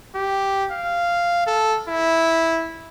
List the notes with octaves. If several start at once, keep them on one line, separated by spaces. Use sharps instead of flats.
G4
F5
A4
E4